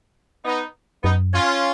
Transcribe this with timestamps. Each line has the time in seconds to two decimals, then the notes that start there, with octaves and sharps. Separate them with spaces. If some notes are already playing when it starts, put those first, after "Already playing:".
0.45 B3 D#4
1.04 F#2 B3 D#4
1.33 C#4 F4